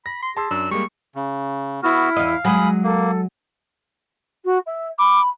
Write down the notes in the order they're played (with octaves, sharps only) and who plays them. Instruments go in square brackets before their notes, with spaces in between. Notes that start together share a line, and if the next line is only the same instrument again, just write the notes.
[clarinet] B5 [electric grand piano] A#6
[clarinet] C6
[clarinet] G#4 [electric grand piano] A5 C6 E6
[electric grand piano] F#2 D4 [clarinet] E6
[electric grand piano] G3 G#3 A#3 [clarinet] C#6
[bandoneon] C#3
[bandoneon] B3 F#4 [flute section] E4 E6 F6
[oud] E2 D#5 [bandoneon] F5
[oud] F#3 G#3 [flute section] G#5 B5 D#6
[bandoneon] A#3 [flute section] A4
[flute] F#4
E5
[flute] B5 [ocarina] D6